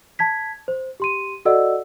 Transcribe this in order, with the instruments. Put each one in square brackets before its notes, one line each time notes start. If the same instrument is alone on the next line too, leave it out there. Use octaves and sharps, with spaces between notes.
[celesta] A5 G#6 B6
C5
G4 C6 D#7
F#4 A4 D5 D#5 F#5 E6